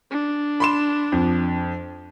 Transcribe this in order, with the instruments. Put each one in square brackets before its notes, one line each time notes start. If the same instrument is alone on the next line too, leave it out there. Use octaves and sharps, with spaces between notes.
[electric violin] D4
[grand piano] B5 C6 E7
F2